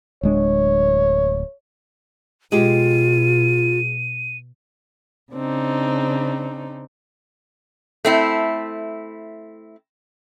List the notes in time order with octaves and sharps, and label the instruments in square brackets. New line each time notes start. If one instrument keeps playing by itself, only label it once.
[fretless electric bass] D1 G#3 D4 [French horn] C#5
[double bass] B2 [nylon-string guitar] G#3 G4 [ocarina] F4 [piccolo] D#7
[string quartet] C#3 C4 D4 D#4
[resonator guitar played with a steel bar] A3 C4 E4